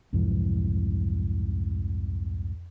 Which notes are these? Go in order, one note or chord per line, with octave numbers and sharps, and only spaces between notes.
C2 F2 G#2 E3